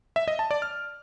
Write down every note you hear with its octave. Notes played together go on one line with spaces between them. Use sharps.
E5
D#5
A5
D5
F6